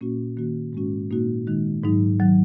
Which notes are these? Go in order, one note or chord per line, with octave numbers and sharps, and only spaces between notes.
A#2 A#3 C#4 F#4
D#3 A#3 F#4
G#2 G#3 C#4 F#4
A#2 A#3 D#4 F#4
D#3 G#3 D#4
G#2 F#3 D#4
D#3 F#3